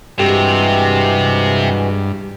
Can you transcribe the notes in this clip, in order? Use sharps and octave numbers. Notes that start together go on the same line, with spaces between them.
G2 C3 E3 G#3 F#4 G4